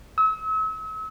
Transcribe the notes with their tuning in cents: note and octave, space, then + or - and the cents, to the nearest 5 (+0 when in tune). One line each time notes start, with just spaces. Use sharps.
E6 -40